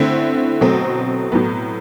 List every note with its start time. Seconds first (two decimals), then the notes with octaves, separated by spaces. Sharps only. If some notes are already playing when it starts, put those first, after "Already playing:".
Already playing: D3 A3 C4 E4
0.61 B2 F#3 A3 C4
1.32 A2 F#3 B3